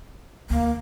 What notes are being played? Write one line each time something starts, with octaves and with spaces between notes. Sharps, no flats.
D2 A#3